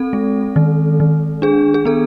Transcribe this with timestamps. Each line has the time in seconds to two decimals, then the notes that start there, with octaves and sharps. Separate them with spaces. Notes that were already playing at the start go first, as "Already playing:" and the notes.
Already playing: C4 A4
0.13 G#3
0.56 D#3
1.00 D#3
1.42 D4 G#4
1.74 G#4
1.85 B3 A4